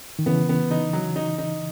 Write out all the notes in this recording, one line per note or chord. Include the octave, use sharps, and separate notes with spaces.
D#3
C#3 E3 B3
B3
D#4
F#3
D#4
D#4